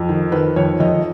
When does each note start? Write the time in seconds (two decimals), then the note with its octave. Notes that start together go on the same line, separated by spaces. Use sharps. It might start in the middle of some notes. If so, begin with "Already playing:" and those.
Already playing: F2
0.09 D#3
0.32 D#3 B4
0.56 F2 C#5
0.80 F2 D#5